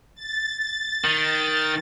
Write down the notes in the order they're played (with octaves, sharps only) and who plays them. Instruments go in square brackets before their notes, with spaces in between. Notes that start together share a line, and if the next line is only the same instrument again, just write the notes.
[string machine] A6
[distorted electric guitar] D#3